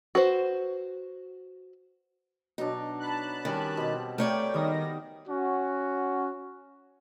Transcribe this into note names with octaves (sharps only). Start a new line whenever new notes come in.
F#4 B4 C5
B2 F#3 D4 D#4
A5 B5 F#6
D#3 G3 C#4
B2 C4 G4
A3 A#4 C#5 D5 G5
D#3 G3 B3 D#4 A#6
C#4 F#4